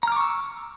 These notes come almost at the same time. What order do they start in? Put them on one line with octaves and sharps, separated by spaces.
A#5 F6 D6 C#6 E6